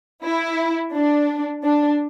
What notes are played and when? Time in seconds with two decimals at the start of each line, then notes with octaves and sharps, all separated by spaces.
0.24 E4
0.94 D4
1.64 D4